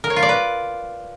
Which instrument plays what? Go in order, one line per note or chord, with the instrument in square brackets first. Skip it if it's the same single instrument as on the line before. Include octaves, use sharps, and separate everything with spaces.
[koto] A#4
C#5
F4
D5
B4